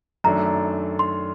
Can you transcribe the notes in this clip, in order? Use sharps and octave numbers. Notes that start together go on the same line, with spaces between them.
F#2 D#3 A3 D4 A4 A#5
C6